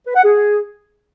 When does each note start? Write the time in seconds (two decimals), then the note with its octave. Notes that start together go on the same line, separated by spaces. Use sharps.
0.06 B4
0.15 F#5
0.24 G#4